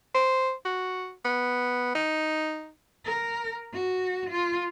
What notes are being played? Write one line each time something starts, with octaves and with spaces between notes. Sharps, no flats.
C5
F#4
B3
D#4
A#4
F#4
F4